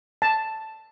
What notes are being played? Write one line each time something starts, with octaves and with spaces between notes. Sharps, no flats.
A5